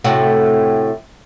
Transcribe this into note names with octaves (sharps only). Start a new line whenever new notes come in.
A2 C3 F#4